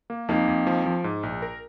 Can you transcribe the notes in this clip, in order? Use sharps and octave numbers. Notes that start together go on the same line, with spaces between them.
A#3
F2 A#3 D#4
F2
F3
F3
G#2
A#1
A#4